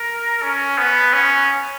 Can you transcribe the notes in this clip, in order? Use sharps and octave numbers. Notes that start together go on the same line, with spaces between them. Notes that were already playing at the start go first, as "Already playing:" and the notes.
Already playing: A#4
C#4
B3
C#4